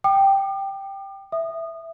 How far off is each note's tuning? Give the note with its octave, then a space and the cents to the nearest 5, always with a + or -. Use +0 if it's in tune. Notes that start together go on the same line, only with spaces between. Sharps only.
G5 +0 D6 +45
E5 +0 D#6 -25